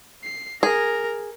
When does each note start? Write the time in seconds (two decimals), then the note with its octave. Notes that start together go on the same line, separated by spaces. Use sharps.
0.24 C7
0.63 G#4 A#4 A#6